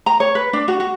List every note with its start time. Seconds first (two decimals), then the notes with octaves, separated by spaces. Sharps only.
0.06 A#5
0.20 C#5
0.35 B4
0.53 D4
0.68 F#4
0.80 F#4